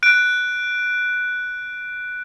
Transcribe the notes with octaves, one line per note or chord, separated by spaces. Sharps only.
F#6 D7